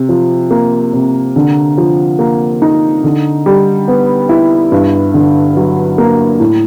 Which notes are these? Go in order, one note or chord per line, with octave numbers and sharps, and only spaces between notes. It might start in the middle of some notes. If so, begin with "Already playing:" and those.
Already playing: C3
F3
A#3
C3
D3
F3
A#3
D#4
D3
G3
B3
E4
G2
D3
F#3
A#3
A2